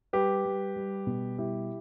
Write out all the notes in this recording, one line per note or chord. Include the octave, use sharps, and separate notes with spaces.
G3 G4 B4
G3
G3
B2
G3 E4 G4